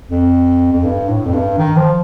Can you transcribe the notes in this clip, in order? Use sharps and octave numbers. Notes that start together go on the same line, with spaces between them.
F2
F2
G2
A2
F2
G2
D#3
F3